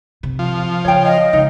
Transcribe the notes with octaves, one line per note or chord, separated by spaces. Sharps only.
C3
F3
C#3 C#5 G5
D#5
C#3 G#3 D#4